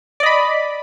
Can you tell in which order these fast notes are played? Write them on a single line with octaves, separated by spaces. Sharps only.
D5 D#5 B5